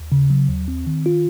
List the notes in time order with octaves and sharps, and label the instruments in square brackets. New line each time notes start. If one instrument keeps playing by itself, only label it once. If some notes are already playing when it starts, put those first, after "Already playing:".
Already playing: [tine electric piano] D#2
C#3
F#3
D#2
C4
D#3
F4